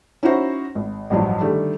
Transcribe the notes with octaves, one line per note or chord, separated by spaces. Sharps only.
C#4 D#4 E4 F#4 C5
G#1
A1 G2 F3 F#3
D3 D#3 G3 A3